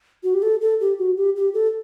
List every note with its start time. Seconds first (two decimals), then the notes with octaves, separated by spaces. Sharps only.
0.24 F#4
0.34 G4
0.42 A4
0.61 A4
0.80 G4
0.98 F#4
1.17 G4
1.36 G4
1.54 A4